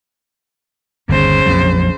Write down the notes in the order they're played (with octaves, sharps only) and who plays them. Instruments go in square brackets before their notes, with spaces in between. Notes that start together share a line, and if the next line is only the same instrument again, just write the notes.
[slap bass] G1 D#2 [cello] C#3 C5
[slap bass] A#1 F2 F#3